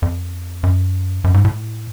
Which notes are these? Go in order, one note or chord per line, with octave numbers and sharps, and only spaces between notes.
F2
F#2
F#2
G#2
A2